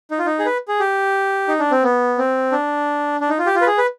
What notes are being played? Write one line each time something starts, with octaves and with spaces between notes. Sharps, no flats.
D#4
F4
D#4
G#4
B4
G#4
G4
D#4
D4
C4
B3
C4
D4
D4
D#4
F4
G4
F4
B4
G#4
B4